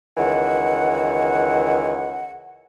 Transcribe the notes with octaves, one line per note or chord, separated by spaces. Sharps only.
C#2 D#3 E3 F#5